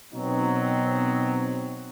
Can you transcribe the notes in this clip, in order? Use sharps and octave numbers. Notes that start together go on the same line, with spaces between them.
B2 F#3 C4 D#4